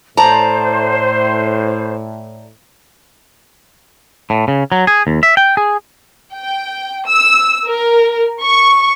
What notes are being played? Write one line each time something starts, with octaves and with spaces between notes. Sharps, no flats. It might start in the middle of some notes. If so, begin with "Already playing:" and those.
A2 C5 D5 A5 A#5
A2
C#3
F#3
G#4
D#2
E5
G5
G#4
G5
E6
A#4
C#6